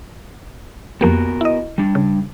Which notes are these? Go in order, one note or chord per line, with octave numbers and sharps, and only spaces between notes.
F2 A#3 B3 F#4 G4 A#4
E4 D#5
G3 D4
C#3